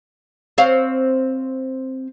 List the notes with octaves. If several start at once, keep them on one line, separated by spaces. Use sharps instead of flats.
C4 C#5 F5